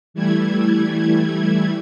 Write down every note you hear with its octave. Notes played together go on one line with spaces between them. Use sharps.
E3 G3 A3 E4 G#6